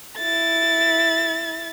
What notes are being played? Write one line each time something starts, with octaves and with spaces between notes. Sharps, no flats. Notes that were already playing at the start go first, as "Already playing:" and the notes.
E4 A6